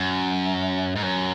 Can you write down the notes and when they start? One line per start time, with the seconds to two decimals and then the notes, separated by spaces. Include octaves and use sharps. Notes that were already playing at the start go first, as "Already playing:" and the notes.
Already playing: F#2
0.96 G#2
1.03 F#2